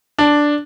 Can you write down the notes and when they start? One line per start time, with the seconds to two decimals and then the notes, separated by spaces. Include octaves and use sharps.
0.19 D4